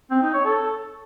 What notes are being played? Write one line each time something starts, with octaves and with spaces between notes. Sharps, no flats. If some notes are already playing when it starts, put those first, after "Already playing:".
C4
D#4
C#5
A4